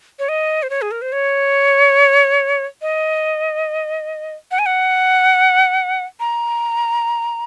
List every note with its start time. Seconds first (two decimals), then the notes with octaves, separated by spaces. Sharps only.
0.19 C#5
0.29 D#5
0.63 C5
0.70 C#5
0.82 G#4
0.91 A#4
1.02 C5
1.12 C#5
2.82 D#5
4.51 F#5
4.59 G#5
4.66 F#5
6.20 A#5